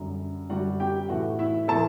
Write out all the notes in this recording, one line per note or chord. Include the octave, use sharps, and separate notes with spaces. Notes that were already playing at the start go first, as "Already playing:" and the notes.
Already playing: F#2 D3 G3
F#2 D3 G3 F#4 F#5
G4 G5
A2 E3 A3 E4 F#4 F#5
E4 E5
A2 E3 A3 E4 A4 A5